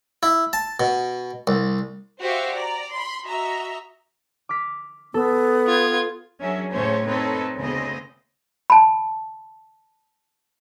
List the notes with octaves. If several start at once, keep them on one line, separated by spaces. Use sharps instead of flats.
E4
A5
B2
C2
F#4 G4 C5 E5 F5
D5 A#5
B5 C6
F#4 D#5 E5 A#5
D6 F6 B6
B3 A4 E6
F4 G#6
F#3 C#4 D4 G#4 A#4 E5
A2 C#3 A3 C#4 C5 C#5
C4 D#4 A4 B4 C#5
D2 C#3 A3 B3 C4 D#5
A5 B5